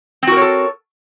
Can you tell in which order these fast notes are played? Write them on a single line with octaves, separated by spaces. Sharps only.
C4 F#4 A#4 C#5 A4